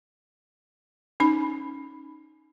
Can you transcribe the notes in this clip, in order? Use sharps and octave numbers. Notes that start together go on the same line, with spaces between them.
C#4 D#4 B5